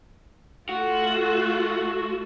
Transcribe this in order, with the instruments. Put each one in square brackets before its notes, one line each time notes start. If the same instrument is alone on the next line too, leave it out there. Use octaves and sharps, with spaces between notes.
[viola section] A3 F4 A4 [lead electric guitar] F#4